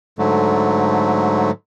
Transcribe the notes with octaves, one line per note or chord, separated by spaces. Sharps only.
G#2 D3 F#3 A3